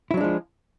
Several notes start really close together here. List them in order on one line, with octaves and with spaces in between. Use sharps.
E4 F#3 D4 G#3 F3